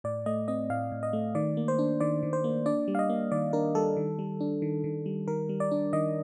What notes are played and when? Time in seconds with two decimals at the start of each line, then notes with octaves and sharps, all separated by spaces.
0.04 A2 D5
0.26 A3 D#5
0.48 C4 D#5
0.70 A2 F5
0.92 A2
1.03 D#5
1.13 A3
1.35 D#3 D5
1.57 A#3
1.68 C5
1.79 D4
2.00 D#3 D5
2.23 D#3
2.33 C5
2.44 A#3
2.66 D4 D5
2.88 G3
2.95 F5
2.99 D#5
3.10 A#3
3.31 D#3 D5
3.53 D4 A#4
3.75 G3 A4
3.97 D#3
4.19 G3
4.40 D4
4.62 D#3
4.84 D#3
5.06 G3
5.27 D#3 A#4
5.49 G3
5.60 D5
5.71 D4
5.93 D#3 D#5